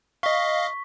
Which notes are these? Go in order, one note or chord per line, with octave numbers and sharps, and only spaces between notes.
D#5 F5 C#6 B6